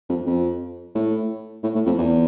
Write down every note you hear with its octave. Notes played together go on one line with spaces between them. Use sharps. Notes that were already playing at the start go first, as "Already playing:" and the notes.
F2
F2
A2
A2
A2
F2
E2